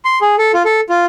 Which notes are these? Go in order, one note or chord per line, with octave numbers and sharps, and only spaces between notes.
C6
G#4
A4
F4
A4
F4